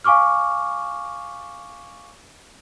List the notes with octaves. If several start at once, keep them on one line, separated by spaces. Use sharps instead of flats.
F5 G#5 C#6 D6 F6